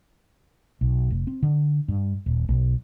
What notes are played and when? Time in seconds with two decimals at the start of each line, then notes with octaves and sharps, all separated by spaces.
0.81 B1
1.10 F1
1.27 C4
1.42 D3
1.88 G2
2.26 D#1
2.49 B1